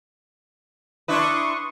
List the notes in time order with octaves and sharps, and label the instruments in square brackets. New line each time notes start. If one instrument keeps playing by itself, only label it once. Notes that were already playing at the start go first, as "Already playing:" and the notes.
[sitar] D4 E4 B4 [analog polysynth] C6 C#6 D#6